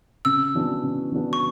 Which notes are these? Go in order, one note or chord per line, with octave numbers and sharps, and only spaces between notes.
C#3 E6
E3 B3 D4 F#4
C#3
E3 B3 D4 F#4
C#6